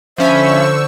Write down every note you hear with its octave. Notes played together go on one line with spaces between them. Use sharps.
D3 F3 C#4 C5 E5 B5 C#6 E6